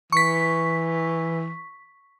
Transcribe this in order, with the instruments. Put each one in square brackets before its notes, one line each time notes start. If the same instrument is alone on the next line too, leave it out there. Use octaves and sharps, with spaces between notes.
[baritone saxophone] E3 [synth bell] C#6 B6